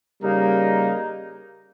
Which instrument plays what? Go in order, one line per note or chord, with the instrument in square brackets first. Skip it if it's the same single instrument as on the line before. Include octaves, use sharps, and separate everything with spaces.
[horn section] C#3 G3 A#3 D#4 A#4